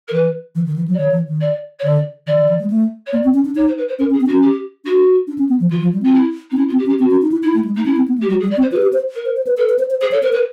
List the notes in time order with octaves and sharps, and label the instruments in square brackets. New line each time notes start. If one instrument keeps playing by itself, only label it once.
[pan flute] A#4
[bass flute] E3 [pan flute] B4
[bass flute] E3
D#3
E3
F#3
[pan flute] D5
[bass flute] D#3 [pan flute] C#5
[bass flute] E3
D#3
[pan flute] D5
C#5
[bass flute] D3 [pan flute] D5
[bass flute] D#3 [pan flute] D5
[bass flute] D#3
E3
G#3
A3
[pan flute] C#5
[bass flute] A#3 [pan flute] D5
[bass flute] C4
C#4
D4
[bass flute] D#4 [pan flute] C#5
[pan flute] C5
B4
C5
[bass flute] C#4 [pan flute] A#4
[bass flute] C#4
[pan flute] G#4
[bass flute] C4
[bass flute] D4 [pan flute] F#4
[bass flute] C#4
[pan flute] G4
[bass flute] D4 [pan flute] F#4
[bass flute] D4
C#4
B3
F3
[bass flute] E3 [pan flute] F4
[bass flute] F3
G3
[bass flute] C4 [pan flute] F4
[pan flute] E4
[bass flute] C4 [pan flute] D#4
[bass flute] C#4 [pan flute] E4
[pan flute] F4
[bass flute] C4
[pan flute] G4
[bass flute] C#4
[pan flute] G4
[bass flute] C4 [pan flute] F#4
[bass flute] C#4
D#4
E4
[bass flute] D#4 [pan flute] E4
[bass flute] A3
G#3
[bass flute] A3 [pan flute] D#4
[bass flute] C#4 [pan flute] E4
[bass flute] C4
B3
A3
[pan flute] G4
[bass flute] G3 [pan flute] F#4
[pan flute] G#4
[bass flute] G3
[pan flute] D5
[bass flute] C4
[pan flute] C5
[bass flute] F4 [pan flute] B4
[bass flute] G#4
G4
C5
[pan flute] A#4
[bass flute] C5
C5
B4
[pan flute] A4 [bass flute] B4
[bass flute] B4
C5
C5
[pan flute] G#4 [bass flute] C5
[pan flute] A4 [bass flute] C#5
[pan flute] A#4 [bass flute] C5
[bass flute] A#4 [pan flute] B4